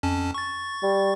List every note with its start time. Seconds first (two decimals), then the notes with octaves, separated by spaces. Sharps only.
0.03 F2 C#4 A5
0.34 C#6 A6
0.83 G3